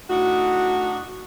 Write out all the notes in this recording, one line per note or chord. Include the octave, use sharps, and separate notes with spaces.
A2 D4 D#4 F#4